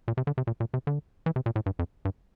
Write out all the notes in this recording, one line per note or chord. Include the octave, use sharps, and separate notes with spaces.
A#2
C3
D3
C3
A#2
A#2
C3
D3
E3
C3
A#2
A2
G2
F2
G2